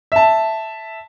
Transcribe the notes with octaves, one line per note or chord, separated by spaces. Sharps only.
E5 A5